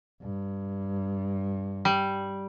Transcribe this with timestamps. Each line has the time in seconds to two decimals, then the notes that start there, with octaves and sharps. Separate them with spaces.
0.22 G2
1.85 G3